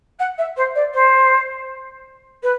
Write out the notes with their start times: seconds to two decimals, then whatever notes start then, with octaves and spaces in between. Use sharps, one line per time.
0.19 F#5
0.38 E5
0.56 C5
0.75 D5
0.94 C5
2.43 B4